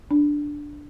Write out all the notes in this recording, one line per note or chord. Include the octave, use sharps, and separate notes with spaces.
D4